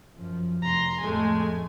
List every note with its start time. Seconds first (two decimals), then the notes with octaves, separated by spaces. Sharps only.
0.16 F#2 F3
0.62 F1 A#5 C6
1.01 F2 A2 G#3 A3 G#5